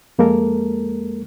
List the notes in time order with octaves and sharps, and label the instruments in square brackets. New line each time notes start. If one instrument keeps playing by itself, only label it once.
[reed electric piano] F2 G#3 A#3 A4 A#4